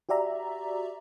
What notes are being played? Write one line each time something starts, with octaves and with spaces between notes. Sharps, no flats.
F#4 G4 D5 E5 A#5